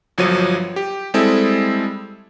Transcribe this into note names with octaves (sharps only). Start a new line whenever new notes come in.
G1 F3 F#3 C#5 D#7
G4
G3 G#3 C4 E4 G#4 A4